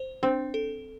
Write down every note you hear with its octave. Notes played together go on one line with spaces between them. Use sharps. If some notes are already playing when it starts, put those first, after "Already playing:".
Already playing: C5
C4 D4
A4